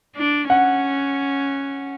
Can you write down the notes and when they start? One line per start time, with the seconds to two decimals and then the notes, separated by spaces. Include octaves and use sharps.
0.16 D4
0.50 C#4 F#5